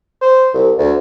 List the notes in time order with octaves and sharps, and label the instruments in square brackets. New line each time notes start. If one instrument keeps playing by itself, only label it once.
[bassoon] C5
C2
D2